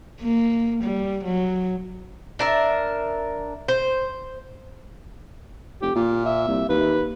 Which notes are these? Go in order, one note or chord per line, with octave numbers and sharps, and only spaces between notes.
A#3
G3
F#3
D4 A#4 E5
C5
F1 G4
A#2 F4
E5
C2
D#2 B4